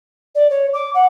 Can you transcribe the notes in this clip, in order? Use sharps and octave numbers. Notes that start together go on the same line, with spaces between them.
D5
C#5
D6
F#5